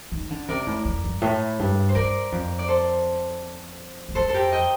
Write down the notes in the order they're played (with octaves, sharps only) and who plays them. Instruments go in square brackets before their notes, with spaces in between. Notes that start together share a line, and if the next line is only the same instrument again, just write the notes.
[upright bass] D#3
D3
[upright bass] C3 [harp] A#4 D5
[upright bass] A2
F2
G2
A2
G2
[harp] C5
[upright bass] G2 [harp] A#4 D5
[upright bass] F2
[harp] D5
A4 C5
[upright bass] G2
[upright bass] F2 [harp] A4 C5
[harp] A4
G4 A#4
D#5 G5